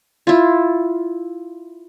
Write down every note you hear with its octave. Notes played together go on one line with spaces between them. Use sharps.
E4 F4